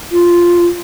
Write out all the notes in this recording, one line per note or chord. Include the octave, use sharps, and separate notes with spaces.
F4